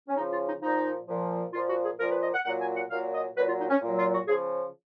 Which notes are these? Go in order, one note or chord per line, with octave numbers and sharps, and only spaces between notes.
C#4
C#3 F3 D#4
F4
D#4
A#2 F3 D#4
A#2 F3
A#2 F3 F4
F#4
G#4
A#2 F3 A#4
B4
D#5
F#5
A#2 F#3 F#5
G#5
F#5
A#2 F#3 F5
D#5
A#2 F#3 B4
F4
D#4
C#4
A#2 F#3
F4
F#4
C#3 F3 G#4